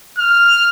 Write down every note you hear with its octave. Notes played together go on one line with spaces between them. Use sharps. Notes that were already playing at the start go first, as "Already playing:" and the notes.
F6